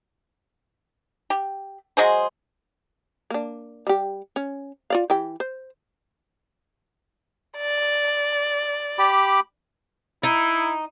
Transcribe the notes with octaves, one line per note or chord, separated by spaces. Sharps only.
G4
F#3 G#3 G#4 C5
A#3 D4
G3 G4
C#4
F4 D5 F5
E3 G4 G5
C5
D5
G4 B5 D6
D#4 E4